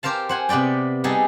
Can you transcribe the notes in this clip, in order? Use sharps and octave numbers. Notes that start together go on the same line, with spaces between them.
G4 A#4 C5 F5 A5
C5 F#5 G#5
C3 B3 B4 D5 G5
G3 B3 D#4 G#4 A4